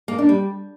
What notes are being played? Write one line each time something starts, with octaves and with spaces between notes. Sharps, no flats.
A#3
D4
G3